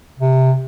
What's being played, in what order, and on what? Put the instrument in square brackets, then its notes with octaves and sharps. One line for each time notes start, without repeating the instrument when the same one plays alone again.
[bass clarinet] C3